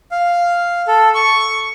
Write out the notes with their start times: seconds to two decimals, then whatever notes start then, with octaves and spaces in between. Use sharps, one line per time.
0.11 F5
0.88 A4
1.15 C#6